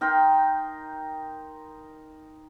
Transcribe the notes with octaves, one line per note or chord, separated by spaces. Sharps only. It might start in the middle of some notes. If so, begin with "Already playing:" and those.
D#4 A#4 G5 C6